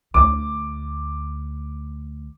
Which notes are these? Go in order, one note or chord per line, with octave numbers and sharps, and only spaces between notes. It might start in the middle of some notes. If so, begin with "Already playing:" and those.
D2 D6